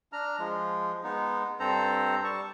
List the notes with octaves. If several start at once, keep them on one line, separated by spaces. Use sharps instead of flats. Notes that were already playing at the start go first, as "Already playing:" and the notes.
D4 A#5 F6
F3 G#3
G#3 B3 D#4
G2 C4 A4 C5 A#5
G3 A5 C#6